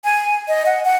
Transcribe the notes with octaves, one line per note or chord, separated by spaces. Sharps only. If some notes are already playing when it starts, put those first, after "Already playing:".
G#5
D#5
F#5
F#5